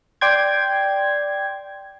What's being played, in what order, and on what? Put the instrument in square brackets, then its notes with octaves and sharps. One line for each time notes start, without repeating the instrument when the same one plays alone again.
[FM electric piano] D5 G5 C6 G#6